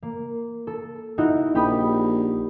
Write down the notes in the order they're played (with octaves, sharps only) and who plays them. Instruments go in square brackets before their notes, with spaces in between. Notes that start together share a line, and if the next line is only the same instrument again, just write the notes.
[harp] A#3
A4
D#4 E4 F#4
[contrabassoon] A#1 [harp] G4 B5 D#6